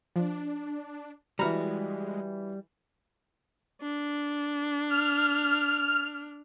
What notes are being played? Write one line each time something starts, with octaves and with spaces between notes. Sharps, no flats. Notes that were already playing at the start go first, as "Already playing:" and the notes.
F3 D4
E3 G3 G#3 F#4 A#5 B5 F6
D4
F6